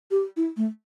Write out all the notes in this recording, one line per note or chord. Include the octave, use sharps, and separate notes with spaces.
G4
E4
A3